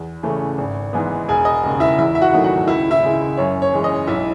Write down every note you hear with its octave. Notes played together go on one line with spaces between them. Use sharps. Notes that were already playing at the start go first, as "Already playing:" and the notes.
Already playing: E2
C#3 E3 A3 C#4
G#1
G#2 E3 G#3 B3
E1 G#4 G#5
D#5
D#2 C#3 G#3
E4 E5
E2 E4 E5
E5
F#4 F#5
D#3 F#3 A3 D#4
F#4 F#5
C#2 E4 E5
E4 E5
C#3 G#3
F#2 C#5
C#5
E3 G#3 C#4
D#5
B1 E4 E5